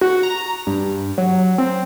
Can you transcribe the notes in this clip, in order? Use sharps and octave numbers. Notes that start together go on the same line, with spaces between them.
F#4
A#5
G2
F#3
C4